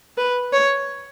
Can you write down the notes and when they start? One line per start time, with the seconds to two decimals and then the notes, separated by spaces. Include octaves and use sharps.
0.17 B4
0.53 C#5